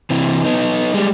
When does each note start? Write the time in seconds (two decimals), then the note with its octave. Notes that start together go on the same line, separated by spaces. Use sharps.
0.10 C3 E3
0.45 B3 D#4
0.94 G3 G#3